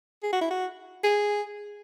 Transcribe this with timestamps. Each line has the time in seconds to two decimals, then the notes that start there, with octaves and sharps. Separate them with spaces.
0.23 G#4
0.33 F#4
0.41 E4
0.50 F#4
1.04 G#4